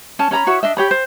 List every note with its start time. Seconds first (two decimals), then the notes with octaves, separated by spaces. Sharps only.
0.19 C#4 A5
0.31 C#4 C#5 A#5 B5
0.46 E4 F#4 C#5 E5
0.63 D4 D#5 E5
0.77 G4 C#5 B5
0.91 C5